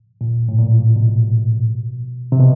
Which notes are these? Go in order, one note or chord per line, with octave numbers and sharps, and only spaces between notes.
A#2
A2
A#2
B2
C3
B2